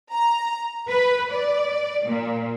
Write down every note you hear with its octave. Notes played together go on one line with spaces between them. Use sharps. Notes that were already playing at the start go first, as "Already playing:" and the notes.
A#5
B4
D5
A#2